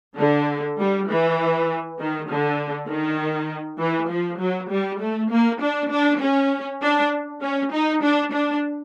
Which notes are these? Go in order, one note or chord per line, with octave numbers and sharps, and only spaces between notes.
D3
G3
E3
D#3
D3
D#3
E3
F3
F#3
G3
A3
A#3
D4
D4
C#4
D4
C#4
D#4
D4
D4